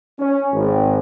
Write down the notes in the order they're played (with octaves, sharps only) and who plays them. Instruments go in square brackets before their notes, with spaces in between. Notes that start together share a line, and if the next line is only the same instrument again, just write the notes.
[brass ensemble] C#4
G#1